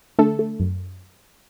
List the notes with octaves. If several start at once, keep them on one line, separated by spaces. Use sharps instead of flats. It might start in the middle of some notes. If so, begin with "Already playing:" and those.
D3 A3 A4
A3
F#2